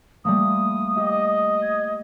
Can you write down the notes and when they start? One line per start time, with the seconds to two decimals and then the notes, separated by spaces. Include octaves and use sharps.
0.25 G3 A3 A#3 D#6
0.97 G4 D#5 G5
1.62 G#6